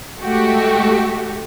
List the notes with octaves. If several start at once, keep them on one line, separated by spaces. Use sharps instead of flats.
G#3 A3 F#4 G4